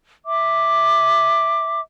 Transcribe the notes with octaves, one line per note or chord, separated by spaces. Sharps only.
E5 D6